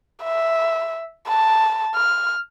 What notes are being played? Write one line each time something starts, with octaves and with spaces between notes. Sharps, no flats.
E5
A5
F6